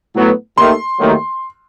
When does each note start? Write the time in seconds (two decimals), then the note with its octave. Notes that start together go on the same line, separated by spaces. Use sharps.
0.15 A2 F#3 B3
0.57 D#2 D#3 A3 C6
0.99 D#2 D#3 F#3 A3